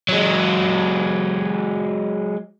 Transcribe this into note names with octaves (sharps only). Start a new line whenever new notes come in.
F#3 G#3